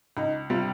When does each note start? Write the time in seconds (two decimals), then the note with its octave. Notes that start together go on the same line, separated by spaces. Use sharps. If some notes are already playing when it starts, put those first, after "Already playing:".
0.17 C#2 D#4
0.50 C3 G3 F4